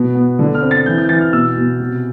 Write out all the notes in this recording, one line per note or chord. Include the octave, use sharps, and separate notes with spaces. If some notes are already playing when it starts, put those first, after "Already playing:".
Already playing: B2 B3
B3
D3
F6
C4
A6
E3 G6
G6
E3 A6
F6
B2 E6
B2
C3